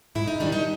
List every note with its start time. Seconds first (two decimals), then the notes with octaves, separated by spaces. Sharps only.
0.15 G#2 E4
0.28 D#4
0.40 D#3 G3 D4
0.52 D#4